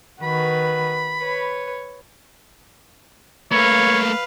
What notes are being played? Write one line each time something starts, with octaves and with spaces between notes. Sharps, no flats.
D#3 F#4 B4 B5
B4 C#5
A3 A#3 B4 C#5 F5